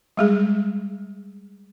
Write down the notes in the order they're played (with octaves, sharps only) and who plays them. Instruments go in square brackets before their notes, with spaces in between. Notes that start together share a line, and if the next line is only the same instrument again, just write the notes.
[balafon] G3 G#3 G#4